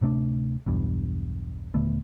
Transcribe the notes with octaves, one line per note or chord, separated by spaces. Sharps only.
D1 C3 A3 D4
B1 E2 G2
D#1 D3 A3 B3